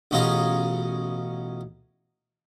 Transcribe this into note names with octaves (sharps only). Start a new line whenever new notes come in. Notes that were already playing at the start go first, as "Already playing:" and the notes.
A1 B2 C#4 F4 G#4 A#5